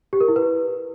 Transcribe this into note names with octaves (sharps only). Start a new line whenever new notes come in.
G4
A#4
E4
B4